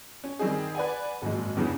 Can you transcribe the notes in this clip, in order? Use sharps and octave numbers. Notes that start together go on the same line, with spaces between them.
C#4
D#3 G3 C4 D#4 G#4
B4 D5 F#5 G#5
G#1 F#2 A#2 F3 F#3 G#3
E2 G2 C#3 E3 C#4